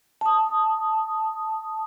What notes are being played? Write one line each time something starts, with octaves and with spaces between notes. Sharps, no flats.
A5 D#6